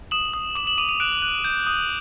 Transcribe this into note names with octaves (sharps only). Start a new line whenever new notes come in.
D#6 E7 F#7
D#6
D6 E7 F#7
E7 F#7
D6 D#7 F7
D#7 F7
F#6 D7 E7
F#6
G6
D#6